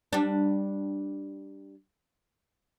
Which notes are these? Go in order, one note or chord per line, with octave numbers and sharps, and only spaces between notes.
G3 D4